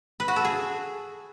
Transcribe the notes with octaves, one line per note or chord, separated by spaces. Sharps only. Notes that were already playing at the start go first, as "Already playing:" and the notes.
B4
F#4
A4
G#4